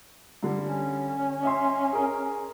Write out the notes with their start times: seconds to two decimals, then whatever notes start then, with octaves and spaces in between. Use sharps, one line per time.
0.43 G2 D3 G3
0.65 C#4
1.43 D#5 E5 C6
1.93 G#4 A#4